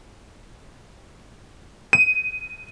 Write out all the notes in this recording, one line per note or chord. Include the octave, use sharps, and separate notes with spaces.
D#7